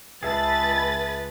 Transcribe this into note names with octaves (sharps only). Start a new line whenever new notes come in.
C#2 G#4 B4 E5 A5 A6